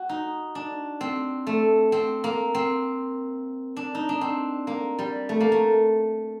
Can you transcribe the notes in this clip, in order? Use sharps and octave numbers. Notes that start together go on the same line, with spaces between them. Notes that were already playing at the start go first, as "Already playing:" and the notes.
Already playing: F#4
D#4
D4
C4
A3
C4
A#3
C4
D4
D#4
D4
C4
A#3
G3
A3
A#3
A3